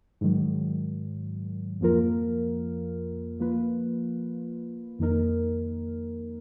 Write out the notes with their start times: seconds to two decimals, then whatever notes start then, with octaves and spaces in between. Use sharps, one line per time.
0.21 G#2 D#3 F#3
1.80 F2 F3 A#3 F4 A#4
3.40 F3 A#3 F4 B4
4.99 F2 D#3 A#3 D#4 A#4